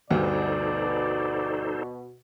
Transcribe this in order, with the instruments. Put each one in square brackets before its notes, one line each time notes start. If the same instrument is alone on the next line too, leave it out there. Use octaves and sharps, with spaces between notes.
[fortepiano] D2 G2 [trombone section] B2 [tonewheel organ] D#4 A4 C5 [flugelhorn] D5